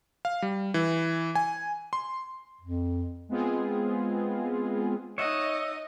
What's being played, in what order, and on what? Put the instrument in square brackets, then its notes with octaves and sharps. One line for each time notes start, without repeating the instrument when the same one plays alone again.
[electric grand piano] F5
G3
E3
G#5
C6
[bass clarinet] F2
[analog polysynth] G#3 B3 C4 F4 G#4
[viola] D#4 D#5 [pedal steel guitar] C#5 E5 F#5